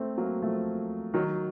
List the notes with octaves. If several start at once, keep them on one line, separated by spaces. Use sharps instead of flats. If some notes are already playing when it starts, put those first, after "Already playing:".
Already playing: A3 C4
F#3 A#3
F3 A3
D#3 F#3